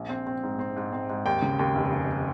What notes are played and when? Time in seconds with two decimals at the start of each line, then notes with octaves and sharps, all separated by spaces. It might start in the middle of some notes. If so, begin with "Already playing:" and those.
Already playing: A#1
0.09 C4
0.27 C4
0.43 G#2
0.59 C4
0.76 G#2
0.93 C4
1.09 G#2
1.26 D#2 G5
1.42 C#3
1.59 D#2
1.76 F1
1.93 F1